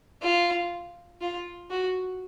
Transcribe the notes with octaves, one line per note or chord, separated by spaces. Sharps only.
F4
F4
F#4